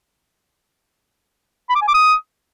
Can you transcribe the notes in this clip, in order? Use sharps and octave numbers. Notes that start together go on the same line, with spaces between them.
B5
D6
G#5
D6
D#6